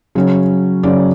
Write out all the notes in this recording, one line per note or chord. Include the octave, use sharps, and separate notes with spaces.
C#3 F#3 C#4
C#3 F#3 C#4 D5